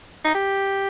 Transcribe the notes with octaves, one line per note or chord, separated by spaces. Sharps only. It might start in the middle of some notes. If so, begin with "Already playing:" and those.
D#4
G4